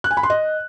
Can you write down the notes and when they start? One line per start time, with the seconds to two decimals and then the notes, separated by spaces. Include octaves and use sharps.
0.04 F#6
0.11 G#5
0.17 B5
0.23 C6
0.30 D#5